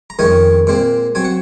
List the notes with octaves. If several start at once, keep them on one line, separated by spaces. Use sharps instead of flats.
A#5
F2 D#3 G#3 C#4 G#5
A#2 G#3 C4
F#3 C4 G#5
F#5